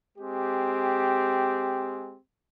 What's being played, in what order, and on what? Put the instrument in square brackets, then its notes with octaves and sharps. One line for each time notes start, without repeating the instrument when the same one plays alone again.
[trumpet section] G#3 C4 G4